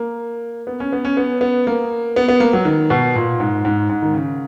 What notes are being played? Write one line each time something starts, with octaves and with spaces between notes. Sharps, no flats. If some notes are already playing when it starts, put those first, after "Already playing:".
Already playing: A#3
B3
C#4
B3
C#4
B3
B3
A#3
B3
B3
A#3
F#3
D#3
B2
A#2
G#2
G#2
G#2
D#3
C#3